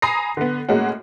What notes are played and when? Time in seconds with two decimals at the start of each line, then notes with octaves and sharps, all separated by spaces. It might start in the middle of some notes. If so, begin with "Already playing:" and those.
0.02 G#5 A#5 B5 D#6 A#6 C7
0.37 D3 B3
0.69 A2 G#3 A#3 C#4 F#4